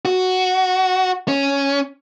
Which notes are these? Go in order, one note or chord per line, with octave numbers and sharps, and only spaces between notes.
F#4
C#4